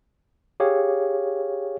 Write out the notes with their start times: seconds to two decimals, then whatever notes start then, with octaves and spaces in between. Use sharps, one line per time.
0.60 G4 G#4 C#5 F5